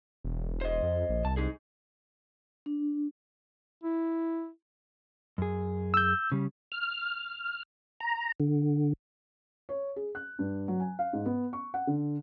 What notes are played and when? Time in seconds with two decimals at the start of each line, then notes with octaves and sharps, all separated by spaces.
0.24 E1
0.61 C5 D#5
0.82 F2
1.09 A#1
1.25 C2 A5
1.37 D#4 G#4
2.66 D4
3.83 E4
5.38 F#2 G#4
5.94 E6 G6
6.32 C#3 G3
6.72 F6
8.00 A#5
8.40 D3
9.69 C#5
9.96 G#4
10.15 F#6
10.39 G2
10.68 F#3
10.80 G#5
10.99 F5
11.13 G#2
11.26 B3
11.53 C#6
11.74 F#5
11.87 D3